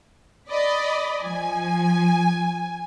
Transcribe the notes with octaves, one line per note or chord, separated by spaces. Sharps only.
D5 D#5 B5
F3 G#5